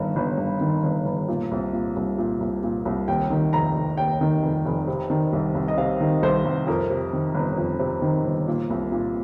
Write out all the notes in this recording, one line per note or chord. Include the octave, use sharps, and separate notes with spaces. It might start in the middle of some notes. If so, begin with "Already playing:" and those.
Already playing: G1 G2 D#3
G1
G2
D#3
G1
G1
A#2
C2
A#2
C2
A#2
C2
A#2
C2
D#2 G5
D#3
F1 A#5
F1
D#2 G5
D#3
F1
F1
C3
D#3
C2
C2
D#5
C3 F5
D#3
C2 C5
C2
F2 A#4
C3
D#3
G1
F2
C3
D#3
G1
A#2
C2
A#2